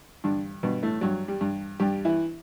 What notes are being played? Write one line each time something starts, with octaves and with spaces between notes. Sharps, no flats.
G2 D3 D4
G2 B2 B3
A2 A3
G2 F#3
G3
G2
G2 G3 G4
E3 E4